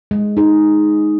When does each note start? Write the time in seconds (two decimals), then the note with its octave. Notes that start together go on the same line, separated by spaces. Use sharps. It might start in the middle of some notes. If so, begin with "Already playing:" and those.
0.11 G#3
0.37 D#4 G#4